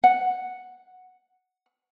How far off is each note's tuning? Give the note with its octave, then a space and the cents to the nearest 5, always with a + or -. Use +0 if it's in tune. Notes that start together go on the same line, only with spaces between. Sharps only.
F#5 -5